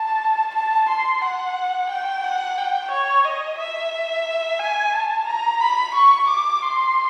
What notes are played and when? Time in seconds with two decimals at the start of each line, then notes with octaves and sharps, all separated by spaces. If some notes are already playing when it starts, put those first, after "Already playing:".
Already playing: A5
0.55 A5
0.89 C6
1.22 F#5
1.90 G5
2.24 F#5
2.57 G5
2.91 C#5
3.25 D#5
3.58 E5
4.60 G#5
4.93 A5
5.27 A#5
5.61 B5
5.95 C#6
6.29 D6
6.62 C6